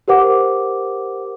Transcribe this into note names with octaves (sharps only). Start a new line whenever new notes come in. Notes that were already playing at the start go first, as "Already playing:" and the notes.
G4 A#4 C5 F#5 D6